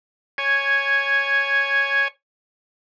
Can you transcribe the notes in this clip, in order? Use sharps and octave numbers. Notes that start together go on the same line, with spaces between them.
C#5 G#5